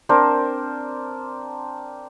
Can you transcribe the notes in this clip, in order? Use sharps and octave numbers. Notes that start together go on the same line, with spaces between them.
C4 D4 A#4 C5